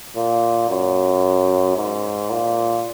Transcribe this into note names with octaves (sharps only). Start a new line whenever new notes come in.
A#2
F#2
G#2
A#2